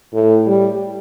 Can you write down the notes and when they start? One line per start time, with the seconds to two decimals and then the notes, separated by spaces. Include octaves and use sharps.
0.13 A2
0.46 G3